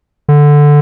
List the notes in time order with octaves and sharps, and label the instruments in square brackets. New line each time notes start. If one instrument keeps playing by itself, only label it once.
[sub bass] D3